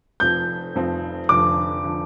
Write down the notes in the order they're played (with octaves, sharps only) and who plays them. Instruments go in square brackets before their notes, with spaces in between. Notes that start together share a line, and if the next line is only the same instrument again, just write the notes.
[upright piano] F1 F2 F3 C4 [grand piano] G6
[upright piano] F1 F2 F3 C4
[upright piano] F1 F2 D3 F3 [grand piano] D6
[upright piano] D3 F3